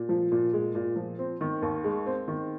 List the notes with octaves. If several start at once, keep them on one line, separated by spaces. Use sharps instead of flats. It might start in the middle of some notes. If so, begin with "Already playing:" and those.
Already playing: A#2
F3
A#2
G#3
A#2
F3
C4
D#3
D#2
G#3
C4
D#3